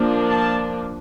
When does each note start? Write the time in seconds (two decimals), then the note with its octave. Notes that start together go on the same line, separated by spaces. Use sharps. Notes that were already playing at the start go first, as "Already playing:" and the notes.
Already playing: F3 A#3 D4
0.30 A5